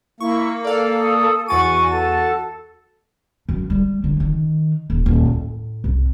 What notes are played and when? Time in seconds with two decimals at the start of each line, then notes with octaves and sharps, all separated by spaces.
0.20 A#3 E4 C#6
0.64 A4 D5 F5
1.01 D#6
1.48 E2 F#4 G#5 C#6 A6 D#7
1.92 A4 A5
3.49 F#2
3.70 G3
4.04 D3
4.20 D#3
4.90 D#1
5.06 D#1
5.25 A2
5.84 C2